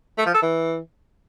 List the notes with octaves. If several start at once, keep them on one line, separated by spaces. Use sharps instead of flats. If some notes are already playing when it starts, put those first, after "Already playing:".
A3
F3
A4
E3